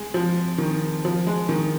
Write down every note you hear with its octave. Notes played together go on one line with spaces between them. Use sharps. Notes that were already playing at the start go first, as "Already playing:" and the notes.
Already playing: G#3
F3
D#3
F3
G#3
D#3